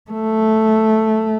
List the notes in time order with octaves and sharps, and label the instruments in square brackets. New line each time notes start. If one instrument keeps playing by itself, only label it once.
[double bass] A3